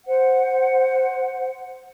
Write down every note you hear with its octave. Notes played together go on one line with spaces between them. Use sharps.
C5 F#5